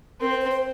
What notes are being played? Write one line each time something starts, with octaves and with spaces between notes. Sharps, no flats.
C4 A#4
C5
C5
C5